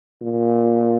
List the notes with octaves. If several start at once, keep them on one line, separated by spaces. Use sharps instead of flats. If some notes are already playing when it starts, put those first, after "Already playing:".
A#2